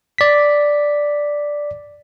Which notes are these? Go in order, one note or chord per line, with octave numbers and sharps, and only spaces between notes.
D5 B6